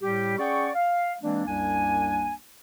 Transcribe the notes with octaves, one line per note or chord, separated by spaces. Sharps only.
A2 G3 G4
C#4 G#4 D5 F#5 G5 C#6
F5
E3 G#3 A#3 C4 D4
C2 F#2 G3 A#3 D4 G#5